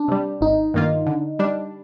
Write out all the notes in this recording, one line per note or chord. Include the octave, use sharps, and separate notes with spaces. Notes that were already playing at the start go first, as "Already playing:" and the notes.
Already playing: D4
C3 G3
G#1 D#4
G2 D#3 A#3 F4
D3
G3 D4